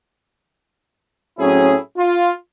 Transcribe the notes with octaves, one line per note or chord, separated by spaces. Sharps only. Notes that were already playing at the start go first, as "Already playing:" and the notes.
A2 F#3 C4 C#4 E4 G#4
F4